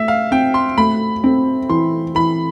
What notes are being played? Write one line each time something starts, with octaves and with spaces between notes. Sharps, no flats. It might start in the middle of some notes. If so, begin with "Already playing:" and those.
Already playing: A3 E5
F5
C4 G5
C6
A3 B5
C4
E3 C6
E3 B5